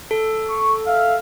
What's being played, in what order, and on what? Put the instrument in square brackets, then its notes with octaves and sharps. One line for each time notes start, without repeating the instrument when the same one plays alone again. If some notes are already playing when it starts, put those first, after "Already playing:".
[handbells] A4
[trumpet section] C#6
E5 F5